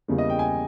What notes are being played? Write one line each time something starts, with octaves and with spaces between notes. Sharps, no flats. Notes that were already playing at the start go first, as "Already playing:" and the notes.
E2 C#3 G3 A#3
D#5
G5
G#5